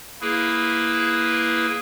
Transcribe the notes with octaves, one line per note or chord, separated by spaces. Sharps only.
A#3 E4 G#4 B4